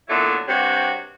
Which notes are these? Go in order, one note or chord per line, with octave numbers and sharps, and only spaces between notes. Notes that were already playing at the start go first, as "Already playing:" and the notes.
A#2 D3 F#3 A3 B3 E4
G2 C3 D4 F#4 C5 C#5